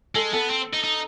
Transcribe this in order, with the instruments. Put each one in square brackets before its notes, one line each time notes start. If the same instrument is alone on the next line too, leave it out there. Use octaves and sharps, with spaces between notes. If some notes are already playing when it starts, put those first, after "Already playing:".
[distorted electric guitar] G#3 [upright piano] A4
[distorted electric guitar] B3 [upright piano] A4
[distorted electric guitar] C4
D#4
D#4